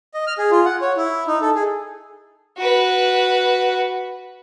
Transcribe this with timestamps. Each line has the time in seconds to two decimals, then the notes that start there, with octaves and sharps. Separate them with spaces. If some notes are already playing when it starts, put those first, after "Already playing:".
0.14 D#5
0.27 F6
0.38 G#4
0.51 F4
0.65 F#5
0.81 C#5
0.97 E4
1.27 D#4
1.42 A4
1.55 G#4
2.57 F#4 B4